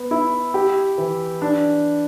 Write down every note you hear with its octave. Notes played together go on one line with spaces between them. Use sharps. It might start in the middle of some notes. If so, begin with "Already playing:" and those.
Already playing: B3
E4
G4
E3
D4